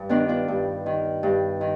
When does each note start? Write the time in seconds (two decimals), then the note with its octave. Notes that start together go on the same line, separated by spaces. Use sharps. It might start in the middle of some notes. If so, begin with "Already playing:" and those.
Already playing: G2
0.09 D#3 B3 D4
0.28 D4 F4
0.48 G2
0.86 D#3
1.23 G2
1.61 D#3